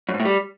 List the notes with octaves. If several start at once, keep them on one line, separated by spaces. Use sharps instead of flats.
F#2
G#2
A2
G3